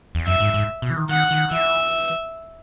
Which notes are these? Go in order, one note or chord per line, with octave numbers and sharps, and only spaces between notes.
E2
F#2 E5
G#2
G#2
B2
E3
D#3
D#3 F#5
D#3
E3 E5